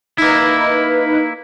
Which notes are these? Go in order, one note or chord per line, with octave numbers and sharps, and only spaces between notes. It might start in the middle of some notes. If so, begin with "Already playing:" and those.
A#3 D#4 E4 B4